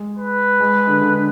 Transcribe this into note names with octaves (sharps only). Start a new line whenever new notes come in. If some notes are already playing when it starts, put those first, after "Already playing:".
Already playing: G#3
B4
G#3
D3
D3